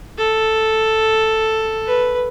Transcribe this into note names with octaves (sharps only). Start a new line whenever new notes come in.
A4
B4